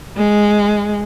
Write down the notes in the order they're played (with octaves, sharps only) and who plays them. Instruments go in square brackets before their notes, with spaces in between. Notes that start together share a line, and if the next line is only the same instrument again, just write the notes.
[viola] G#3